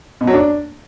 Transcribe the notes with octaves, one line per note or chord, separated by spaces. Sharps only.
B2
F#3
D4